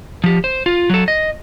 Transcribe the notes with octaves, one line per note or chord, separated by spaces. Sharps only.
F3 G4
C5
F4
F#3 A4
D#5